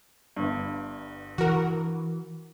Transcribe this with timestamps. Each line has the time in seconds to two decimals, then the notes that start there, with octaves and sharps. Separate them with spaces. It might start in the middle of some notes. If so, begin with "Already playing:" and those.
0.37 G1 G2
1.38 E3 F#4 A#4